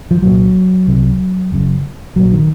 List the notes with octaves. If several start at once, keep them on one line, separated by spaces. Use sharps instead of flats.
F3
C2 A#2 F#3
C2 C3
F#1 F#2 C#3
A#1 A#2 F#3
D#3